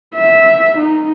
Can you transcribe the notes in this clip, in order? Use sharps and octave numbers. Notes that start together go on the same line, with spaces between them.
E5
D#4